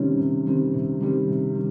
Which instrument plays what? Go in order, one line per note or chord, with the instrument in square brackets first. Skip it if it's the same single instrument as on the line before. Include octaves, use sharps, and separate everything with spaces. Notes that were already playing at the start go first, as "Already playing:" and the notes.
Already playing: [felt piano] C3 D#3 G3 C4 [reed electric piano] C#4
[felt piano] C3
D#3 G3 C4
C3
D#3 G3 C4
C3
D#3